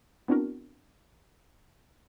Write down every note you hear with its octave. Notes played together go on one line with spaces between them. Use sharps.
B3 C4 D4 E4 F#4 A#4